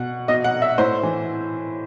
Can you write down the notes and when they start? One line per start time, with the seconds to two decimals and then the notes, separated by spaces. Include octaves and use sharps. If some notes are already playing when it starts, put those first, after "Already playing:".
Already playing: B2 F#5
0.28 B2 D#5
0.44 F#5
0.62 E5
0.78 A2 C5
1.03 E3